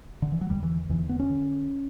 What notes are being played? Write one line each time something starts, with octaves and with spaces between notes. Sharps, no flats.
D3
E3
F#3
E2 D3 G3
E3
E2 D3 E3
B3
C#4
D3